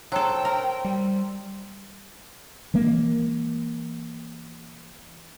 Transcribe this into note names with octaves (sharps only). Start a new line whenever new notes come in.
F#3 A4 C5 G5 C6 E6
A#4
G3
E3 G#3 A#3